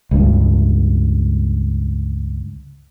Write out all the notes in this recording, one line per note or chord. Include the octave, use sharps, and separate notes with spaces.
C#2 G2